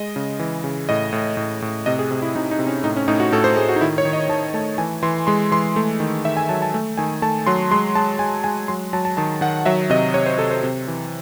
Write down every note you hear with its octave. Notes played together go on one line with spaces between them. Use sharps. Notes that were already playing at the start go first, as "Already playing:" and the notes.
Already playing: G#3 D#5
C#3
E3
C#3
A2 D#5
A2
A2
A2
C3 D#5
G#4
C3
E4
C3 D#4
D#4
C3
C#4
A2 D#4
C#4
A2 D#4
F#4
A2 A4
C5
A2 G#4
F#4
D#4
D#3 E4
C#5
D#3
D#5
D#3 A5
A3 A5
E3 G#5
E3 C6
G#3 C6
E3 C6
A3
D#3
D#3 E5
G#5
F#3 A5
A5
A3
D#3 G#5
A3 A5
F#3 C6
G#3 C6
G#3 A5
G#3 G#5
G#3 G#5
F#3 C6
F#3 A5
A5
D#3 A5
D#3 F#5
F#3 E5
C3 D#5
C3 C#5
C5
C3 A4
C5
C3
E3